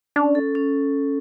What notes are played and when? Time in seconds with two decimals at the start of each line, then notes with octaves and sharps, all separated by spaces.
0.16 C#4 D4
0.35 A4
0.55 C#4